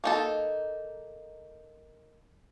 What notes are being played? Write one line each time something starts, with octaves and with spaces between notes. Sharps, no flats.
A#3 D#4 A4